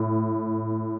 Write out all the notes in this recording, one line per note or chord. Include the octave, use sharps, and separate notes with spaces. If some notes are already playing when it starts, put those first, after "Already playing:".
Already playing: A2